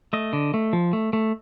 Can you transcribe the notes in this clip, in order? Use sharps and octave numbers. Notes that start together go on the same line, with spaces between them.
A3 D#5
D3
A3
F3
A3
A3